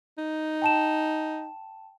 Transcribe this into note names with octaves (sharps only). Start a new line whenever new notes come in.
D#4
G5 A5 E7